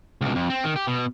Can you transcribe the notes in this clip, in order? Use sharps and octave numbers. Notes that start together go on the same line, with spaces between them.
C#2 B2
F2
C4
D#3
G4
B2